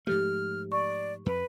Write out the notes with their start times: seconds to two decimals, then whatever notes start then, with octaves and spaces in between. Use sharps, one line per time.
0.07 G#2 F3 A3 G4 F6
0.72 D5 C#6
1.26 F2 B4